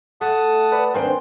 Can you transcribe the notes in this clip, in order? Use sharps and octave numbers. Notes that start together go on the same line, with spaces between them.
A3 F#5 A5 D#6
B4 D5 B5
D#2 C4 D4 A#4 B4 G5 G#5 C6